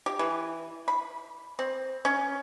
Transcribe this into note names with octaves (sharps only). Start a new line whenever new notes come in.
G4
E3
B5
C4
C#4